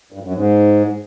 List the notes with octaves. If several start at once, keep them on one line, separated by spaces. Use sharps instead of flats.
G2
F#2
G#2